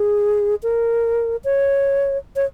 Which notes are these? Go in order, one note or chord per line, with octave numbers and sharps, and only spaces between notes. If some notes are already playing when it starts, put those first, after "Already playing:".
Already playing: G#4
A#4
C#5
C#5